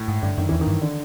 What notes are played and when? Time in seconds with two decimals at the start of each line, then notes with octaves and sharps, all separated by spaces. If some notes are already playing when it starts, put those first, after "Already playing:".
Already playing: A2
0.08 G#2
0.22 G2 D3
0.38 F#2 D#3
0.49 E2 E3
0.61 D#3
0.67 G2
0.82 D3